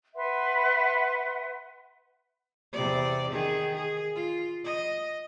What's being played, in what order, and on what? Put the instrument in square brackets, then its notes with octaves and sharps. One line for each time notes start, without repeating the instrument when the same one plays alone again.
[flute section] B4 E5 F#5 C6
[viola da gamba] E2 C3 D5
D#3 G#4
G#4
F4
D#5